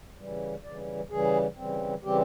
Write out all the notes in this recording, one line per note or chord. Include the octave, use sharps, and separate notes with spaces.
C#3 E3 G3
C#3 E3 G3 D5
C#3 E3 G3 G#4
C#3 E3 G3 C4
C#3 E3 G3 C4 G4